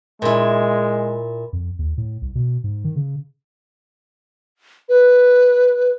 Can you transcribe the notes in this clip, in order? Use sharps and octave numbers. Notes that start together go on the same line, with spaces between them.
A#2 G#3 E4
F2
D#2
A2
C2
B2
G#2
D#3
C#3
B4